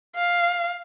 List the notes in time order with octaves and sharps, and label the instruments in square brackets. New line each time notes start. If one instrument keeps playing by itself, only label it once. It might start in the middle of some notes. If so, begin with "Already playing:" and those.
[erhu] F5